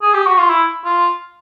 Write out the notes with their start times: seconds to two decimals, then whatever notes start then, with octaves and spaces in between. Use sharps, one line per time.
0.02 G#4
0.14 G4
0.27 F#4
0.38 F4
0.50 E4
0.85 F4